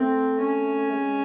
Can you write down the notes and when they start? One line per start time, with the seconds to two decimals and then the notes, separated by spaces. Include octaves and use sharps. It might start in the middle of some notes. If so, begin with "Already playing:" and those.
Already playing: A3 C4
0.41 C#4
0.92 G#3